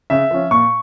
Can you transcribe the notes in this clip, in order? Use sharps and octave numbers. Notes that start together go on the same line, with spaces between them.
C#3 E5
F3 C#4
A#2 C#6